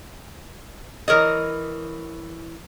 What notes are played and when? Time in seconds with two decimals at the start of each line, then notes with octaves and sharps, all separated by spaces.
1.08 E3 A#4 C#5 D#5